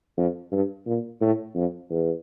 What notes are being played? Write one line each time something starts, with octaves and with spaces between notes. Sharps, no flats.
F2
G2
A#2
A2
F2
E2